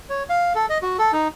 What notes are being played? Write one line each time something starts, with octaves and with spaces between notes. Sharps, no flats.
C#5
F5
A4
D#5
F#4
A4
D#4